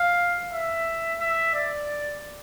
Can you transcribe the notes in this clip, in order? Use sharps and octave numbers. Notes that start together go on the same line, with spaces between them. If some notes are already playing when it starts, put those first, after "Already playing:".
Already playing: F5
E5
E5
D5